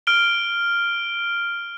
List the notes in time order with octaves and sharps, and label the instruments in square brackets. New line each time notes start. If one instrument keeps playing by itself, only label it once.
[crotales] F6 D7 G7